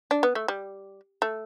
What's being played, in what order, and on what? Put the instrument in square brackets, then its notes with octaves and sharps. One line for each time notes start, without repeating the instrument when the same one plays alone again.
[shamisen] D4
B3
A3
G3
A3